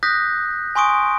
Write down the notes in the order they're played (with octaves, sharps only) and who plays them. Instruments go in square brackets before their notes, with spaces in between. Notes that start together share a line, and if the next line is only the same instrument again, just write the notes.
[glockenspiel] D#6 F#6 G6 A#6 B6
G#5 C6 C#6 D#6 D7